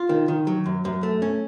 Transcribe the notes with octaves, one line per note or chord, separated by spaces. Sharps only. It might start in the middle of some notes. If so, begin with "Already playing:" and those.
Already playing: F4
D#3
D#3
F#3
F#2
F#2
A3
C#4